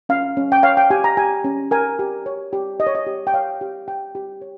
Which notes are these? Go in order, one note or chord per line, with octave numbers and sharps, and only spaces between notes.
C#4 F5
C#4
G5
C#5 F5
G5
G4 G#5
A#5
G4 G#5
C#4
A#4 G#5
G4
C#5
G4
G4 D#5
C#5
D#5
G4
G5
C#5 F5
G4
G4 G5
G4
C#5